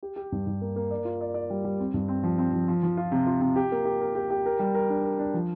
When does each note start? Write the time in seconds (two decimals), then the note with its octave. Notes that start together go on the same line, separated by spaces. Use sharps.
0.03 G4
0.16 G4
0.32 G2
0.46 G2
0.61 A#3
0.76 A#3
0.91 D5
1.05 F4
1.21 D5
1.34 D5
1.50 G3
1.64 G3
1.80 C4
1.94 G2
2.08 C4
2.23 F3
2.38 C4
2.53 F3
2.68 F3
2.83 F3
2.97 F4
3.12 C3
3.27 F4
3.41 C3
3.56 G4
3.72 A#3
3.85 G4
4.01 A#4
4.15 G4
4.30 G4
4.46 A#4
4.59 G3
4.74 A#4
4.90 D4
5.04 A#4
5.19 D4
5.34 F3